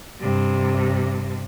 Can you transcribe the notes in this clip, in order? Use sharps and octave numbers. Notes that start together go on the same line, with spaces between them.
G2 C3